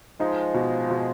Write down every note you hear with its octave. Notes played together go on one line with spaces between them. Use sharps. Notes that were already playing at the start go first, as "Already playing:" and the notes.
F3 G#3 D#4
B2
B2